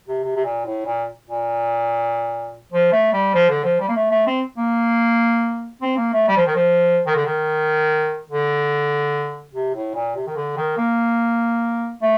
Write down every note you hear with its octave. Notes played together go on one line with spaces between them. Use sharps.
C3
C3
C3
A#2
A2
A#2
A#2
F3
A3
G3
F3
D3
F3
G3
A#3
A3
A3
C4
A#3
C4
A#3
A3
G3
F3
D#3
F3
D#3
D3
D#3
D3
C3
A2
A#2
C3
D#3
D3
D#3
A#3
A3